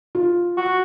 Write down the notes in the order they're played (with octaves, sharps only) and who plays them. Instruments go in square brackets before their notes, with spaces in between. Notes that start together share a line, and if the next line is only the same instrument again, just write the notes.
[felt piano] F4
[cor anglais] F#4